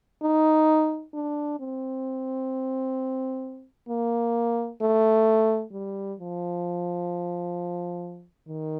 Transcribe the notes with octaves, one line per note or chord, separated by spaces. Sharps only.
D#4
D4
C4
A#3
A3
G3
F3
D#3